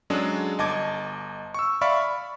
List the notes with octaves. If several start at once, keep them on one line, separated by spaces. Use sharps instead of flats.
F#3 G#3 C#4 D4 G#4 A4
G1 D#5 A5 D6 G#6
C#6 E6
D5 E5 F5 B5 C#6 F6
B5